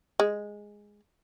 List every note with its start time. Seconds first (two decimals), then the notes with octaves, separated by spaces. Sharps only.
0.20 G#3